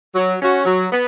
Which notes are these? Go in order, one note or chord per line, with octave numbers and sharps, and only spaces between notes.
F#3
C#4 F#4
F#3
B3